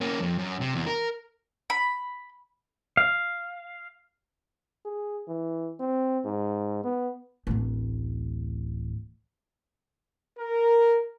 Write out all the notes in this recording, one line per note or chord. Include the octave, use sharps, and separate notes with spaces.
A#3 C#4
F2
F#2
C3
E2
A#4
B5
F5
G#4
E3
C4
G#2
B3
D1 A1
A#4